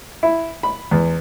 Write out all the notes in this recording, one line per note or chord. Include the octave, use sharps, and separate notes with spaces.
E4
B5
E2